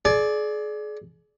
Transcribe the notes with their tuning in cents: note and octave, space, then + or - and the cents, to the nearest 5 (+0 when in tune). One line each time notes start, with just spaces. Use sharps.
G#4 +35 D5 +0